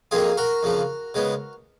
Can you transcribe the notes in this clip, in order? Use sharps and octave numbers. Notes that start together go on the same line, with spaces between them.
F2 D#3 A#3 F4 G#4
F#4 A#4
F2 C#3 F3
C#3 G#3 B3